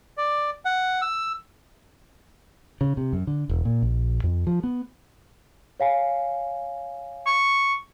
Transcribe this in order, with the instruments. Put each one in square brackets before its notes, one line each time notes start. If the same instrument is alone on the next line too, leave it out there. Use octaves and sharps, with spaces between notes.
[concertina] D5
F#5
E6
[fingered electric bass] C#3
C3
F#2
D3
E1
A#2
A#1
F2
F3
B3
[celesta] C#5 F5 G#5
[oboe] C#6